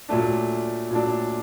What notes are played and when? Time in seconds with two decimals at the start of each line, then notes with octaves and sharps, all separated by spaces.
0.09 A#2 F#3 A3 D4
0.91 A#2 F#3 A3 D4